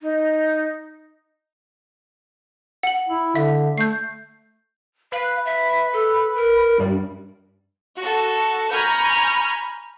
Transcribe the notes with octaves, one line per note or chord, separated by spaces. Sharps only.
D#4
F#5 F#7
E4
D3 E5
A3 G6 C7
B4 F5
E5
A4
A#4
G2 G3
F#4 A4
G#5 A#5 B5 C#6 F6 G6